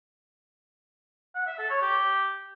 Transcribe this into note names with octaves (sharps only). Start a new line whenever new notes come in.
F#5
E5
A4
C#5
G4